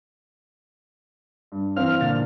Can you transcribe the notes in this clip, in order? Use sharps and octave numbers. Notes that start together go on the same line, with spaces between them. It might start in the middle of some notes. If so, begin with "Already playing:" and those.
G2
E3 C4 F5 F6
A#2 D3 A6